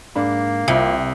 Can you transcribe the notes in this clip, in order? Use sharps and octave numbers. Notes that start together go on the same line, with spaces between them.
G#2 A#3 D4 B5
C2 C3 C4 F4 B5